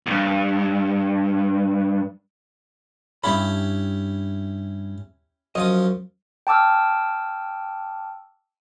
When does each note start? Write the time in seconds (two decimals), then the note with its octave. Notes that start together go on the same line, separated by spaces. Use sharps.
0.06 C2 G2
3.24 G2 C#4 E4 G4 B5
5.55 F#2 F3 D#5 D#6
6.47 G5 A5 D6 E6 F6